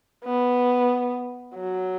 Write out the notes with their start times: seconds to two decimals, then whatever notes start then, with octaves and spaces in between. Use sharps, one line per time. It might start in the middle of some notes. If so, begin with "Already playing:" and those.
0.25 B3
1.54 F#3